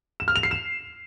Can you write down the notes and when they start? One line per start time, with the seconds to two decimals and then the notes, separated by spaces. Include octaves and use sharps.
0.20 E7
0.28 F6
0.36 F7
0.43 C7
0.51 E7